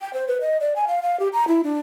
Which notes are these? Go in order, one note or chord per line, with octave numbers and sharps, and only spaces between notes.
G5
C5
B4
D#5
D5
G#5
F5
F5
G4
A#5
E4
D4